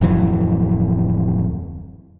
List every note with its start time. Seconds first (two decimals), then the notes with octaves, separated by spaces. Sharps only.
0.01 D1 F2 E3 F#3